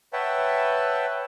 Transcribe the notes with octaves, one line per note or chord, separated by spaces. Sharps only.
B4 C#5 E5 F#5 G5 A5